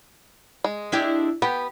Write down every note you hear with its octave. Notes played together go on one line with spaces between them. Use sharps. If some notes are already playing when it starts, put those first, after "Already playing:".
G#3
D4 E4 G4
B3 G4